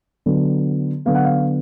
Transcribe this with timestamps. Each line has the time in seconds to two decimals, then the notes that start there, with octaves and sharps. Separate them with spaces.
0.26 D3 F#3 B3
1.05 D3 F#3 B3 F5
1.15 F#5
1.25 F5